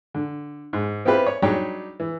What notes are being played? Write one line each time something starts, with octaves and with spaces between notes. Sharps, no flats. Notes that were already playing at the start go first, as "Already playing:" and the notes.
D3
G#2
B3 C4 E4 F4 G4 B4
C#5
F#3 G3 D4 D#4 G4 C#5
E3